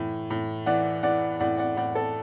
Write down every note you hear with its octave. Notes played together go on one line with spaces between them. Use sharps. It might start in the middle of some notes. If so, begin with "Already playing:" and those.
Already playing: A2 E3
A2
E3 D5 F#5
E3 D5 F#5
A2 D5 F#5
D5 F#5
A2 D5 F#5
A4